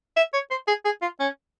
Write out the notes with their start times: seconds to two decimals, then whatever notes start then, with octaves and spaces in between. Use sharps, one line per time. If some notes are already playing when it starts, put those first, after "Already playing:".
0.17 E5
0.33 C#5
0.50 C5
0.68 G#4
0.85 G#4
1.02 F4
1.20 C#4